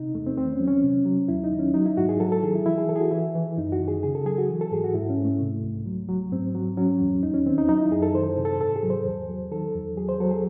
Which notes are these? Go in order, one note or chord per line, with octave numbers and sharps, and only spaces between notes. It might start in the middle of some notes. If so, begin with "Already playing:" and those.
Already playing: C3 D#4
E2 A3
C4
D#3 C4
C#4
F#3
C#4
C3
F#3
D#2 E4
D#4
D#3
C#4
F#3 D#4
E4
G#2 F#4
G#4
F#3 A4
A4
D#3 G#4
E4
E3 E4
G#4
E3 A4
G#4
F#4
E3 E4
E3
F#2 D#4
F#4
D#3
G#4
C#3 G#4
A4
F#3 G#4
F#4
E3
A4
G#2 G#4
F#4
G#2 E4
C#4
G#2
A3
C3
C2
F#3
F#3
G#2 C4
F#3
F#3 C#4
E2
D#2 D#4
C#4
D#3 C4
D#4
F#3 D#4
E4
F#2 G#4
A4
D#3 C5
A4
C3
A4
G#2 A4
G#4
F#3
C5
E2
F#3
D#3 A4
E2
F#3 G#4
C5
F#3 A4
G#4